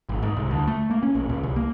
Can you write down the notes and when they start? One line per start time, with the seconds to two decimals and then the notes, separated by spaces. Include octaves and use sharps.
0.09 G#1
0.23 G#2
0.36 C2
0.51 D2
0.67 A3
0.91 A#3
1.03 C#4
1.15 A#1
1.29 C#2
1.43 C2
1.56 A#3